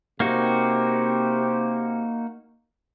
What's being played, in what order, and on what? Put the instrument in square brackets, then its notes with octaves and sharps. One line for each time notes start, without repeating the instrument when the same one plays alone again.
[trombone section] C3 C4 G4 [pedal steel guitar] A#3 D#4 F#4